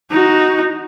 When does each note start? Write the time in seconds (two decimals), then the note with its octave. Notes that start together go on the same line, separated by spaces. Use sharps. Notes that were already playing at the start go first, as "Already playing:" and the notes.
0.11 D#4 F#4